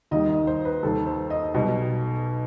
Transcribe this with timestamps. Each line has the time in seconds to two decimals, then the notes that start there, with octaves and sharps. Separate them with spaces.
0.11 D#2 D#3 G3 D#5
0.30 D#5
0.47 C5
0.65 B4
0.83 D#2 D#3 G3 A4
1.06 C5
1.30 D#5
1.54 B1 B2 G3 D#5